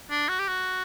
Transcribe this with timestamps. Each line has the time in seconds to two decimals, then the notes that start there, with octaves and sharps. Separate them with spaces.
0.10 D4
0.29 F#4
0.39 G4
0.48 F#4